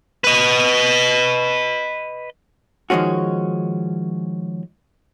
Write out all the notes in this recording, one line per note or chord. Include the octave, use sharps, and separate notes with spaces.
B4 D#5
D#3 F3 G#3 C#4 F#4